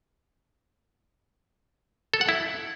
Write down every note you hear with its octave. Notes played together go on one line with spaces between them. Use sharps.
A4
F#5
E4